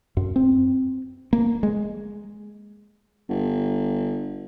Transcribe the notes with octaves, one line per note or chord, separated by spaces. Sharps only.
F#2
C4
A#3
G#3
G1